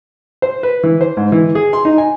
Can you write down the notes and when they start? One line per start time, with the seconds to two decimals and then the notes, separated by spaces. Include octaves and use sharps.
0.42 C5
0.63 B4
0.83 E3
1.01 C5
1.17 G#2
1.32 E3
1.55 G#4
1.73 C6
1.85 D#4
1.98 G#5